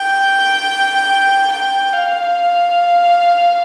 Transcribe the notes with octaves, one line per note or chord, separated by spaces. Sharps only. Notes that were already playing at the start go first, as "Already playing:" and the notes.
Already playing: G5
G5
F5